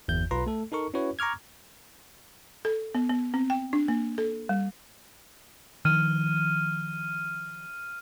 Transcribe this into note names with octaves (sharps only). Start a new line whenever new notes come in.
G1 E2 G6
B1 F4 B4 A#5 C6
A3 A4
D#4 A4 A#4 C#6
C#4 E4 F#4 B4 C#5
A#5 C#6 D6 F6 G#6
A4
B3
B3
C4
G5
D4
A#3
A4
G3
D#3 F3 F6 D#7